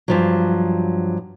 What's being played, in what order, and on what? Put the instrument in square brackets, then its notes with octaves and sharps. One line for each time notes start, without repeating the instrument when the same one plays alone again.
[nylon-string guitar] G2 F3 F#3